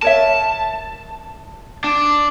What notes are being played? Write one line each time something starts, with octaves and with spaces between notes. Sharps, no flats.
A#4 C#5 E5 A5
D4